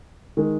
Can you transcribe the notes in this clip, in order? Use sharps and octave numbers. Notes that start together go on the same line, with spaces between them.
D#3 G#3